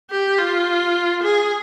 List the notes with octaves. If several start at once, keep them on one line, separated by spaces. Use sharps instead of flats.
G4
F4
G#4